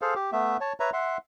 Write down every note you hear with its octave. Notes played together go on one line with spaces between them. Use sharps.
G#4 A4 C5 F5
G4
A3 B3 E5
C#5 A5
B4 C#5 E5 A#5
E5 F#5 C6